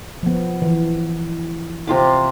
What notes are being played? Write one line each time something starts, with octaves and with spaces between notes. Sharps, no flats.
F3 B3
E3
C3 F4 D6